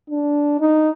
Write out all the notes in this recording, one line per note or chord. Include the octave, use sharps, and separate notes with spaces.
D4
D#4